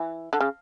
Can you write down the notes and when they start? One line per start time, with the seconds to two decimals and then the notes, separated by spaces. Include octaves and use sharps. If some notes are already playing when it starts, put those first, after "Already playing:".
Already playing: E3
0.33 D3
0.40 C#3